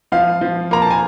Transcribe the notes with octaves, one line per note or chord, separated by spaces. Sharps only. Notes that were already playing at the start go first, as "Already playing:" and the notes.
F3 F5
F3
A#3 A#5
A5
G#5